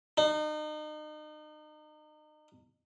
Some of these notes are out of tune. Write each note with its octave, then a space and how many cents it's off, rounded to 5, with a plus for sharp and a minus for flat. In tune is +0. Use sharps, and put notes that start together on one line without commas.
D#4 -35